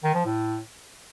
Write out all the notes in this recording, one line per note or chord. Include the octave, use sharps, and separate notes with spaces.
D#3
F3
A2